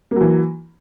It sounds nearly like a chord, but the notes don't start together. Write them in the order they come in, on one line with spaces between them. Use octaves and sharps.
A#3 F#3 E3